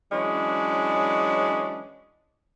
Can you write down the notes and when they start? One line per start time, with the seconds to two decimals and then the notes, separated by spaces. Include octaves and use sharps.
0.12 E3 F#3 G#3 C#4 D4